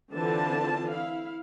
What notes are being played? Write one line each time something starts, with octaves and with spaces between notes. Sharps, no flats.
D3 E3 C4 F4 A5
E4 F5